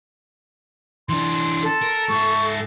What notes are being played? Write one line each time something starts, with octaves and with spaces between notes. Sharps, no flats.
E3 D4 C6
A4
A#4
G#2 E5 C#6